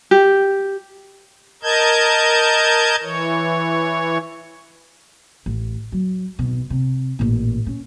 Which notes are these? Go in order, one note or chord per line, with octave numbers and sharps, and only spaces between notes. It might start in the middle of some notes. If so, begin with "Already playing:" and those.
G4
A#4 D#5 A5 G6 G#6
E3 C#5
A1
F#3
G#1 B2
C3
A1 A#2
C#4